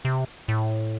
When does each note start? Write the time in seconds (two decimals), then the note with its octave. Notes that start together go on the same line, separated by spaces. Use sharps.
0.05 C3
0.48 A2